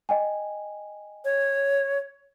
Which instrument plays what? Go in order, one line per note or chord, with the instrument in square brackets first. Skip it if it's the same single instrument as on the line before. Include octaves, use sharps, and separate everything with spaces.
[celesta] D#5 G5 G#5
[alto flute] C#5